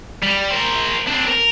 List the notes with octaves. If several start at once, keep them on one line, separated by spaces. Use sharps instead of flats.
G3
A#4 C5
C4 D4
A#4